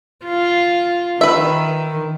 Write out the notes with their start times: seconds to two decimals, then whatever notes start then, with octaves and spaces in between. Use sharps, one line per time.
0.25 F4
1.21 D#3 B4 E5